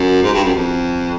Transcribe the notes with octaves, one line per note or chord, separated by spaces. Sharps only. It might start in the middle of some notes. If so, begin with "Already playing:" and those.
Already playing: F#2
G#2
G2
F#2
F2